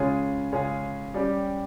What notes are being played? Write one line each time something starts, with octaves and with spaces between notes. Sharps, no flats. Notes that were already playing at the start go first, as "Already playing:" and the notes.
Already playing: C#3 G#3 C#4 F4 G#4
C#3 G#3 C#4 F4 G#4
G3 C#4 G4